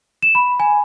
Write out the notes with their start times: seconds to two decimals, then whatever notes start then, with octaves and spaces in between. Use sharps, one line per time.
0.22 E7
0.35 B5
0.60 G#5